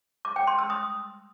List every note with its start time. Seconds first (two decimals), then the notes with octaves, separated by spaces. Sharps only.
0.25 D6
0.36 G5
0.47 C6
0.59 E6
0.70 D#6